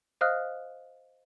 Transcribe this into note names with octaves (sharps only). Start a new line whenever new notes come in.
C5 D#5 F5 D#6 F6 F#6